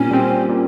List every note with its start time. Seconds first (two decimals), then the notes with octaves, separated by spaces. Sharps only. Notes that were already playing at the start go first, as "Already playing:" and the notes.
Already playing: A#2 G3 C4 C#4 G4
0.11 G3 C4 G4
0.49 A#2